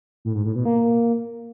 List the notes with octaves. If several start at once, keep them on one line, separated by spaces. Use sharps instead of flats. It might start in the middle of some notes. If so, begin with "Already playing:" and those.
A2
G#2
A2
B2
A#3